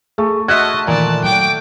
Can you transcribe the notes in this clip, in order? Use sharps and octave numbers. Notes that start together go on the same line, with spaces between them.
A3 G#4
F#4 D#5 E5 F#5 A5 C6 F6 G#6
A#2 D#3 E3 D5 A5
F#3 G5 D6